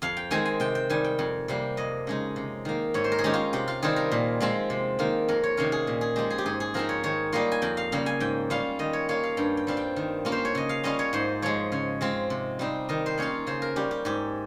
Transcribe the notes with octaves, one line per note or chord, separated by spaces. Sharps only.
F2 F5
G5
D#3 G#3 C4 G#5
G#5
C3 G5
G5
D#3 G3 G#5
G5
F2
C3 G3 A#3
F2 D#5
C#3 G#3 D#4
C3
D#3 A#3
G#2 C#5
C5
A#4
G#4
D#3 G#3 C#4 G4
F4
C3 G4
F4
D#3 G3 C4 F4 G#4
A#4
A#2
F3 G#3 C4 F4
C3
D#3 A#3 F4
F2 A#4
C#5
C3 D#3 A#3 C#4 A#4
G#4
A#2
G#4
F3 G#3 G4
G#4
G4
G#2 G#4
G#4
F3 C4 D#4 A#4
C#5
D#3 C#5
G3 A#3 F4 D#5
G#5
F2 G5
F5
C#3 G3 A#3
G#5
G#2 G5
G3 C#4 F4 F5
D#3 D#5
C#5
A#3 F4 C#5
F5
G2 G5
G5
G3 C4 F4
G5
D#3
A#3 C#4 F4
C5
C#5
C#3 D#5
F5
G3 C#4 F4 D#5
C#5
G#2 C5
F3 G#3 C#5
C#3 C#5
G#3 C4 F4
C3
G3 C4 D#4
D#3 D#5
C5
A#3 C#4 F4 C#5
C#3 C5
A#4
G3 C#4 G4
G4
G#2 G4